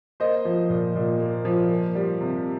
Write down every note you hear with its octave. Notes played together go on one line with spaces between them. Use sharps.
A#3 C5 D#5
F3
A#2
A#2
A#3
F3
A#3
G3
C3